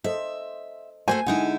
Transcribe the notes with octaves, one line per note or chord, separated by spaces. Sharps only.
A4 C5 D#5 E5
A3 F#4 C5 G#5
D3 G#3 D#4 E4 F#5